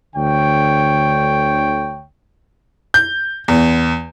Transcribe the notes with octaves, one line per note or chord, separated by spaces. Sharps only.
D2 D3 C#5 G5
G6
E2